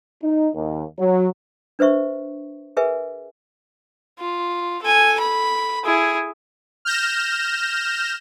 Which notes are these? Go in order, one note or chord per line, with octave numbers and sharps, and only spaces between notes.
D#4
D#2
F#3
D4 B4 C5 E5 C#6
G#4 A#4 B4 E5 G#5
F4
A4 G#5
B5
E4 G#4
F6 G6 A#6 E7